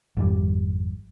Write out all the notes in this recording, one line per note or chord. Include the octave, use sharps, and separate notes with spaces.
G#1 F2 G3